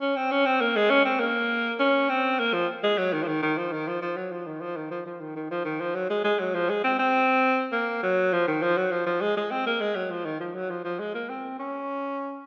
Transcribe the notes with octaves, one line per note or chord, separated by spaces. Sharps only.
C#4
C4
C#4
C4
A#3
G#3
C#4
C4
A#3
C#4
C4
A#3
F3
G#3
F#3
D#3
F3
D#3
D#3
F3
D#3
F3
F3
F#3
F3
D#3
F3
D#3
F3
F3
D#3
D#3
F3
D#3
F3
F#3
G#3
G#3
F#3
F3
G#3
C4
C4
A#3
F#3
F3
D#3
F3
F#3
F3
F3
G#3
G#3
C4
A#3
G#3
F#3
F3
D#3
F3
F#3
F3
F3
G#3
A#3
C4
C#4